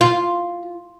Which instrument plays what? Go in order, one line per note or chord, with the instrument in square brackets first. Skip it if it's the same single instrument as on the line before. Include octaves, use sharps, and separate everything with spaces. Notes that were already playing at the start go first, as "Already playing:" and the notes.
[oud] F4